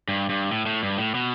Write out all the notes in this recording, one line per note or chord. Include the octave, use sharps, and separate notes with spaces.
G2
G2
A2
A2
G2
A2
B2